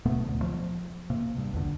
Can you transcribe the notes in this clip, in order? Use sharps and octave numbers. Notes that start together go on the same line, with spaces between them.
D#1 B2 A3 B3
A1 D2
F3
C3 A#3
G2
A#1 E2 D3